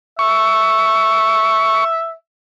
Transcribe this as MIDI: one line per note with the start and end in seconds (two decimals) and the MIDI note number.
0.19 2.13 76
0.19 1.84 85